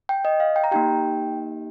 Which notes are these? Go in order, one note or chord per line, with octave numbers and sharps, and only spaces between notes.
G5
D#5
F5
G5
A#5
A#3 D#4 G4 G5